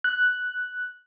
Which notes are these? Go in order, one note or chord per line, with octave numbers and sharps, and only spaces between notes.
F#6